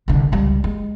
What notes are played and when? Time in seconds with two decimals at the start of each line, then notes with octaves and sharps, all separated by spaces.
0.08 C2 D3
0.32 C#2 G3
0.64 G#3